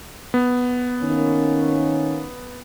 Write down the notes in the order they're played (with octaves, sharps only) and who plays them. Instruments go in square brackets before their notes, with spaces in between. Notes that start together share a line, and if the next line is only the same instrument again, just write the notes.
[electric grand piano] B3
[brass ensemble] D#3 A#3 C#4